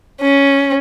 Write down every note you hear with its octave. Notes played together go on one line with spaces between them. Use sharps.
C#4